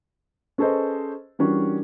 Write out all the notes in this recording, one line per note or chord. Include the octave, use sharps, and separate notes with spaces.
C#4 G#4 A4 B4 C5 D#5
E3 G3 C#4 D4 F#4 A#4